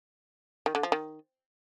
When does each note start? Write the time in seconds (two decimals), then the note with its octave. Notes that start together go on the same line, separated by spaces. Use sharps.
0.66 D#3
0.75 D3
0.83 F3
0.92 D#3